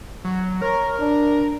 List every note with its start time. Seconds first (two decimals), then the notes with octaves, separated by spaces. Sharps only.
0.25 F#3
0.62 A#4 C#5
0.99 D4